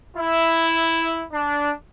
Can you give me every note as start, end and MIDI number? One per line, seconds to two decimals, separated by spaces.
0.16 1.22 64
1.32 1.71 62